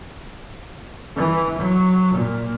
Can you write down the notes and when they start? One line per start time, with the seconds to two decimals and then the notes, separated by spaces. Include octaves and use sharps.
1.17 E3
1.59 F#3
2.15 A#2